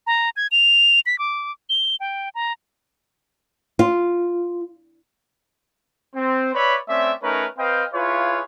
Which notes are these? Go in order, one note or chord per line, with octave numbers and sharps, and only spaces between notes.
A#5
G#6
F7
B6
D6
G7
G5
A#5
F4
C4
B4 C#5 D5 E5 B5
A3 C4 C#4 D5 E5
A3 C#4 D#4 A#4 B4 C#5
C4 B4 D#5 F5 G5
E4 F4 G#4 B4 C#5 F5